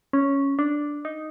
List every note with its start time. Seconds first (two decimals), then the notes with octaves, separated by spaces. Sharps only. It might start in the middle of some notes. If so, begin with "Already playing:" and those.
0.13 C#4
0.59 D4
1.05 D#4